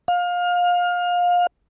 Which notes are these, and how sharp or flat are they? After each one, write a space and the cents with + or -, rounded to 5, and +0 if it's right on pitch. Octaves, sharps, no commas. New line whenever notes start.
F5 +25